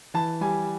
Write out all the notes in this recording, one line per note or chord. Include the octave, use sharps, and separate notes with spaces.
E3 A5
G3 G#5